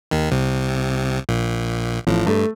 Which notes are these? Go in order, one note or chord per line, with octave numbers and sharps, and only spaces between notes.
D#2 D#3
C2 C3
A#1 A#2
A1 A2 F3
G2 A3